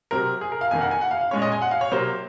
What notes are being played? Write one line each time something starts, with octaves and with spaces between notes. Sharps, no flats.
C3 F#3 C4 A#4
G#4
A#4
F5
F2 D#3 A#3 G#5
F#5
G#5
F#5
F5
F5
A#2 G#3 C#4 C#5
D#5
G#5
F#5
F5
C#5
C3 F#3 A#3 C5